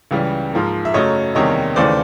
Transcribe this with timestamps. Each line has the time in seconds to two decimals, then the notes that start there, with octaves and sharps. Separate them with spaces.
0.11 C#2 C#3 E3 G3
0.53 G#2 F3 A#3
0.85 E5
0.94 F#2 C#3 F#3 A3 C#5 D#5
1.35 E2 C3 D#3 G3 A#3 C#5 D#5
1.76 D#2 C#3 E3 A3 C5 D5